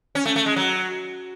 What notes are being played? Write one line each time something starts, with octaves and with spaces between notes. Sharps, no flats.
C#4
A3
A3
G#3
F#3